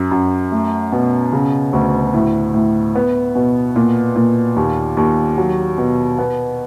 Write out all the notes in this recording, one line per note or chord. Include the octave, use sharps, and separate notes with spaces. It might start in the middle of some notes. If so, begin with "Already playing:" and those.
Already playing: F#2
F#2
A3
B2
C#3
D2
A2
A2
B3
B2
A#2
A#2
D#2
D#2
F#3
B2
B3